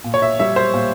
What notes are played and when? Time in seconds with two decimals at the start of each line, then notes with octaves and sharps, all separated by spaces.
0.04 A#2
0.14 C#5
0.22 E5
0.39 G3 E5
0.56 C5
0.74 A#2